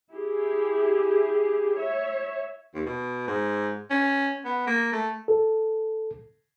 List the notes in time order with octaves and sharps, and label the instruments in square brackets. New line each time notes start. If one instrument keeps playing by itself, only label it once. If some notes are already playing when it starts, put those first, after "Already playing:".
[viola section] E4 G4 G#4
C#5 E5
[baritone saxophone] D#2
B2
G#2
C#4
B3
A#3
A3
[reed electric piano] A4